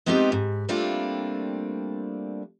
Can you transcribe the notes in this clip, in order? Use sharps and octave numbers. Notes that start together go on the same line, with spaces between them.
G#3 B3 C4 D#4 F4 G4
G#2
G3 A3 A#3 C4 D4 F4